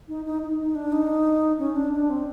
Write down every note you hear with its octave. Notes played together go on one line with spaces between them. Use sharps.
D#4
D#4
D#4
D#4
D4
D#4
C#4
D4
D4
C4